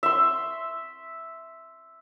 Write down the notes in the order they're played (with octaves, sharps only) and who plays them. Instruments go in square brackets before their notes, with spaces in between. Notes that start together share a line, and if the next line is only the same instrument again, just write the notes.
[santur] E5 C6